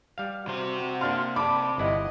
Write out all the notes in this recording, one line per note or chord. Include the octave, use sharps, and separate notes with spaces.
G3 F5
C3 F#4 C5
A#3 D4 F5 C6 F6
D5 A5 B5 D6
G1 E4 D#5 F#5